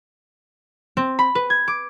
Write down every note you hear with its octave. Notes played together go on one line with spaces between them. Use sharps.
C4
B5
B4
G#6
D6